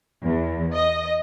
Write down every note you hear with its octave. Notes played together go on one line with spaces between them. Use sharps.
E2
D#5